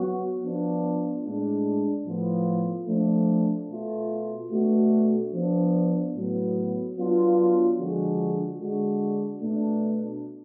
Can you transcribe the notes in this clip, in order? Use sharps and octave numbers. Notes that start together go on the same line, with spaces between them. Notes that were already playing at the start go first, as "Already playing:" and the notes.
Already playing: F#3 B3 F#4
F3 B3 D4 F4
A2 G#3 D4
A2 F3 B3 F4
F3 A3 D4
B2 A3 F4
B2 A3 D4 F#4
F3 B3 D4
A2 F#3 B3
F#3 B3 D4 F4
D3 F3 G#3 D4 F#4
D3 G#3 D4 F#4
B2 A3 D4